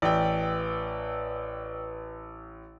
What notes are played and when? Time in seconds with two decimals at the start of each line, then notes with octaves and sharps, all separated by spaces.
0.02 A1 B4 D5 F5 G5 E6